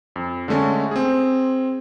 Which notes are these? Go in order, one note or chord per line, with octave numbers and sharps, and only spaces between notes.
F2
D3 G#3 A3 C#4
C4 G#4